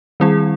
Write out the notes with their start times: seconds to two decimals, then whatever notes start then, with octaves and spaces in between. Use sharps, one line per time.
0.20 D#3 G3 C4 E4 G#4